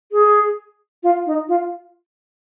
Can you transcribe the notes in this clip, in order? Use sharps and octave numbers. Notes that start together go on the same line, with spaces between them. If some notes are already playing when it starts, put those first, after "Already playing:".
G#4
F4
D#4
F4